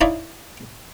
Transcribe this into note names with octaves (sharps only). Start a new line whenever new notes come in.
D#4 E4 C#5 D5 E5 F5